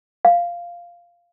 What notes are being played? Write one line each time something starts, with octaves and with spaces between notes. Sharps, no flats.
F5